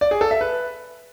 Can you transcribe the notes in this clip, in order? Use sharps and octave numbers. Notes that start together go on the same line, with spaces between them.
D5
G#4
A4
E5
B4